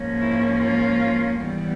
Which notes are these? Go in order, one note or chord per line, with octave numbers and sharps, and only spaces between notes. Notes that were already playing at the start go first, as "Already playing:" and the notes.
Already playing: G#2 F3 A#3 C#4
E4
F4
E3 G3 B3